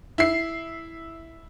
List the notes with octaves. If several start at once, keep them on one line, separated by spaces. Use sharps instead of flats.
E4 C7